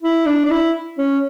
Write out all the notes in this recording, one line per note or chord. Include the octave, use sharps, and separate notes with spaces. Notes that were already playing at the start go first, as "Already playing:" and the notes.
E4
D4
D4
E4
C#4